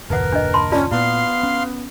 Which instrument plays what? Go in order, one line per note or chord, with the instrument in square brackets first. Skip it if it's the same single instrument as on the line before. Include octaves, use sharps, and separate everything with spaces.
[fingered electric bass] F#1 D#2 A#2 [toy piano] D#4 F#5 [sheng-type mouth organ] A#4 [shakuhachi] B4
[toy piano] D4 D#5
A5 B5 C6
[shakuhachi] C#4 [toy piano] F4 D5 A5
[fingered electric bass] A#2 [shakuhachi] B3 [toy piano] E4 [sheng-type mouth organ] F5 C6
[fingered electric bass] C#4